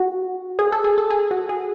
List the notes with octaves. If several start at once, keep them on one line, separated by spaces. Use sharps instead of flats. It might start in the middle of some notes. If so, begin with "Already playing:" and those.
Already playing: F#4
G#4
A4
G#4
A4
G#4
F#4
G#4